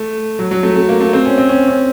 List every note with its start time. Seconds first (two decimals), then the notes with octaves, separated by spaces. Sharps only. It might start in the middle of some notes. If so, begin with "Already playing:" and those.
Already playing: A3
0.39 F#3
0.51 F#3
0.63 A3
0.75 A3
0.89 A#3
1.01 A3
1.13 C4
1.25 C#4
1.38 C4
1.49 C#4
1.68 C#4